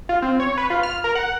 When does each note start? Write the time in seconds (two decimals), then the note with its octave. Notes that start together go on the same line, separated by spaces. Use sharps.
0.09 F4
0.22 C4
0.40 C#5
0.58 B4
0.70 F4
0.83 F6
1.04 A#4
1.15 F#5